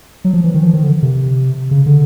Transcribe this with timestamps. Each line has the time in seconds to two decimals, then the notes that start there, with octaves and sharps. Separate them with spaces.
0.25 F#3
0.33 F3
0.44 E3
0.54 D#3
0.63 F3
0.73 D#3
0.83 D3
1.02 C3
1.71 C#3
1.86 D3